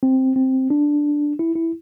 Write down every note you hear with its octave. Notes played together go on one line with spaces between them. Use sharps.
C4
C4
D4
E4
E4